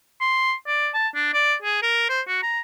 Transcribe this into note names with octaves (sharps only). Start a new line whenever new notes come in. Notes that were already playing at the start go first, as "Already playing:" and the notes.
C6
D5
A5
D4
D5
G#4
A#4
C5
F#4
A#5